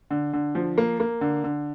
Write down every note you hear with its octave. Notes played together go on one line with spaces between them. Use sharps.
D3
D3
F3
A#3
A#3
D3
D3